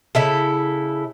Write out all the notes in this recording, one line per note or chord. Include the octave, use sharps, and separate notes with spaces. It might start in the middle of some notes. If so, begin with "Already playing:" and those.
C#3 E4 A4